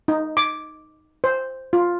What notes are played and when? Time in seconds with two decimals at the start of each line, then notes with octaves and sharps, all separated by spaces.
0.08 D#4
0.37 D6
1.24 C5
1.73 F4